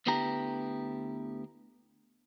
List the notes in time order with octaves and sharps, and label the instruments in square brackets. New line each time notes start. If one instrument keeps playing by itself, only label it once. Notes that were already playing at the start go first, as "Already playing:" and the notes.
[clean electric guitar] D2 D3 B3 E4 G4 A#5